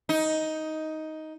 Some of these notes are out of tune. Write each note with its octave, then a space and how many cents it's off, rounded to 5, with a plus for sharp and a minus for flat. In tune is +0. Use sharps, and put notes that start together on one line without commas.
D#4 +10